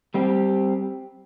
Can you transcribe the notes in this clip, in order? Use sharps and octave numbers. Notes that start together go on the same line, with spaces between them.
G3 C4 G4